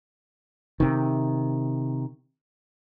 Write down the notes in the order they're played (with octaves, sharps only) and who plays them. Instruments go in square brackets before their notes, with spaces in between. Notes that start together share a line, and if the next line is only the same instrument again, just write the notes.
[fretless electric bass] C3 D#3